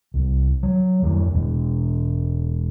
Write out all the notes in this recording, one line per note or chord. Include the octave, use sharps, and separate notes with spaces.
C2
F#3
F2 D#3
E1 B2